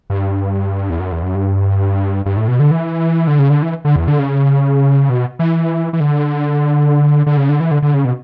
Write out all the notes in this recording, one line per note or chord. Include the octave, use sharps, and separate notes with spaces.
G2
E2
F#2
E2
F#2
G2
G2
A2
B2
D3
E3
D3
C#3
D3
E3
D3
E2
D3
C#3
B2
E3
E3
D3
D3
C#3
D3
E3
D3
D3
C#3
B2